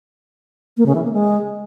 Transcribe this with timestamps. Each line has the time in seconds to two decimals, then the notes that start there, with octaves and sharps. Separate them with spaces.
0.77 A#3
0.86 C#3
0.95 E3
1.04 A#3
1.13 G#3